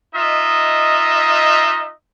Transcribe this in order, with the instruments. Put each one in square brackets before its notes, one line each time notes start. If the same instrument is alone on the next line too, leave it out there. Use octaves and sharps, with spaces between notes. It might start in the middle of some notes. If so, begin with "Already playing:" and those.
[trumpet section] D#4 F4 D#5 E5